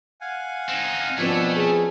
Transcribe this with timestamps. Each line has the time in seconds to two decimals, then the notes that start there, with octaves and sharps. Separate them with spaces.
0.21 F5 F#5 G#5
0.69 C4 D#4
1.18 B2 F3 A3 C4 D4 B4 C#5 G#5
1.56 C#4 G#4